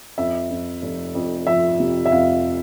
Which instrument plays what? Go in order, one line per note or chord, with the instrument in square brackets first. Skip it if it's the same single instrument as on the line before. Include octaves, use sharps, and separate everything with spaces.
[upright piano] F2 E5
F2
F1
F2
F3 E5
C3
E5
F2 F5